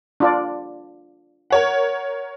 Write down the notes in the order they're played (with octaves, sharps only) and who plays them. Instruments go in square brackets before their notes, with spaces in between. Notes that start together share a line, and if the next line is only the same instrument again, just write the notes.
[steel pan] D4 F4 D5
[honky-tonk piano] A#4 C#5 F#5